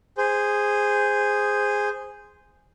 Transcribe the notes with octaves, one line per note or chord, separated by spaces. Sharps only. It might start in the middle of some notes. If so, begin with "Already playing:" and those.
G#4 C5